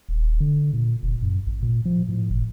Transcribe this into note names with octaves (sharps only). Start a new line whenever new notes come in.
D#1
D3
A#2
F1
F#2
A1
A#2
F3
A2
G1